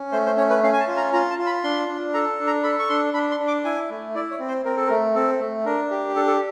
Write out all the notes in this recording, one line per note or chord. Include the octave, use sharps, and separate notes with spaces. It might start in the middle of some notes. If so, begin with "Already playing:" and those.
Already playing: C#4
A3 C5
C5
C#4 C#5
B4
C#4 F5
G#5
A5
F4
A#5
F4 A#5
A5
F4
B5
D4 C6
D4
A4 A#5
D4
A#5
A4 B5
C#6
D4 C6
D4 B5
C6
D4
D6
E4 G#5
A3
E4 D5
C#5
C4
C5
C4 A#4
A4
A#4
A3
C4 A4
A3
D4 A#4
G4
D4 A4
A4